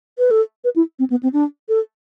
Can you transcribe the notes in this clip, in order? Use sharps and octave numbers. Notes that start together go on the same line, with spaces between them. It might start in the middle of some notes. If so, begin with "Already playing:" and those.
B4
A4
B4
E4
C4
B3
C4
D4
A4